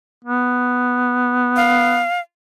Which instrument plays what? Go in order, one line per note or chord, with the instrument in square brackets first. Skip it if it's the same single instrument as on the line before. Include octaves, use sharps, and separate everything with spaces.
[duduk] B3
[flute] F5